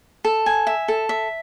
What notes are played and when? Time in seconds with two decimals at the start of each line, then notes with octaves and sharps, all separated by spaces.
0.25 A4
0.46 G#5
0.67 E5
0.88 A4
1.09 E5